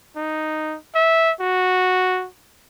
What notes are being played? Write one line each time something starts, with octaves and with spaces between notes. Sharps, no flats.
D#4
E5
F#4